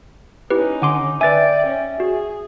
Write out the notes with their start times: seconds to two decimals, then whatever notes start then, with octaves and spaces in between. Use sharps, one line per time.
0.50 C#4 D#4 E4 G4 B4
0.82 D3 F#5 G#5 C6 D6
1.21 B4 D5 E5 G5 G#5 A6
1.67 C#4
2.00 F#4 G#4